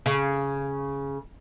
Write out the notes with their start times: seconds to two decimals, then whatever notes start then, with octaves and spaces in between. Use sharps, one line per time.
0.06 C#3